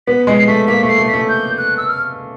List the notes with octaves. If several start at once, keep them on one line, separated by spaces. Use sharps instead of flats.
B3 B6
G#3
C7
A3 B6
A#3 B6
A3
C7
A3
B6
A3
G6
F#6
E6
F6